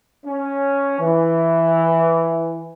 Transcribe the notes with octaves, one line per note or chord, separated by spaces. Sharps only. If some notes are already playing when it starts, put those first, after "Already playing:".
C#4
E3